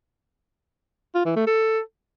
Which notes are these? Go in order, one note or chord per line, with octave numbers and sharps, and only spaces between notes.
F4
E3
A3
A4